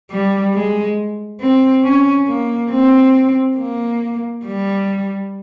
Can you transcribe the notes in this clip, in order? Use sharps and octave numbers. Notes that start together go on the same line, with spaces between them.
G3
G#3
C4
C#4
A#3
C4
A#3
G3